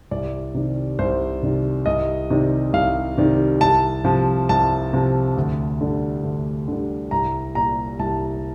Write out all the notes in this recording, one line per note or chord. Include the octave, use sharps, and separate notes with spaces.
C2 D5
C3 D#3 G3
C2 C5
C3 D#3 G3
C2 D#5
C3 D#3 G3
C2 F5
C3 D#3 G3
C2 A5
C3 F3
C2 A5
C3 F3
D2
D3 G3
D2
D3 G3
C2 A#5
A#2 G3 A#5
C2 A5